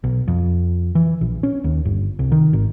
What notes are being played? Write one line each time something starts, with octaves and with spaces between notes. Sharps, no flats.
B1
F2
E3
A#1
C#4
D#2
G1
C2
D#3
G#1